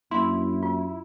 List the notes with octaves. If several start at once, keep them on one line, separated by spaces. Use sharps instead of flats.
F#2 A#3 D4 E4 C6
F4